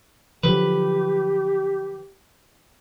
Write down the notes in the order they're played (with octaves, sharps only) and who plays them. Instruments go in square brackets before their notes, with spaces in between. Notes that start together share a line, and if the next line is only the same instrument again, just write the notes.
[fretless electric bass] D3 F3 F#3 [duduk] G4 [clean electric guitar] B4